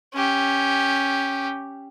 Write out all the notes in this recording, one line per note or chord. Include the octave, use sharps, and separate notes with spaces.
C#4 G4